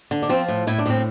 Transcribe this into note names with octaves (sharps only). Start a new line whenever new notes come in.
D3
D4
F3 C4
A2
A2 E4
D4
A2 C4